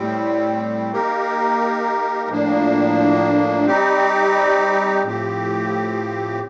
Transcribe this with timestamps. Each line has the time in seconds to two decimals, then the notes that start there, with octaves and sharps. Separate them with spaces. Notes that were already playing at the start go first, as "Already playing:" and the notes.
Already playing: A2 G3 C4
0.92 A#3 D#4 G4 A#4
2.29 A2 F3 A#3 D4
3.66 G3 C4 D#4 G4
5.03 A2 F3 C4 G4